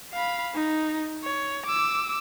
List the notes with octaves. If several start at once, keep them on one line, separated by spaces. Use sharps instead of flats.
F5 B5
D#4
C#5
D6 E6